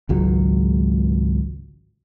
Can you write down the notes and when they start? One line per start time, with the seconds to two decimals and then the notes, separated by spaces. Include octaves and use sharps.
0.09 G#1 C#2 F#3